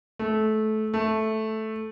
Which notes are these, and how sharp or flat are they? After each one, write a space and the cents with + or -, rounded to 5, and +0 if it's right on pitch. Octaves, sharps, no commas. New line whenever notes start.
A3 -20
A3 -5